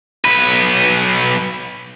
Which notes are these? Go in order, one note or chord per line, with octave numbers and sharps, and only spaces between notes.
B1 B4